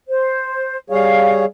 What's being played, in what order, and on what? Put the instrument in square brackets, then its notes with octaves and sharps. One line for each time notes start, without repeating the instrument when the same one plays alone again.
[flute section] C5
[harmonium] G3 G#4 C#5 [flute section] F5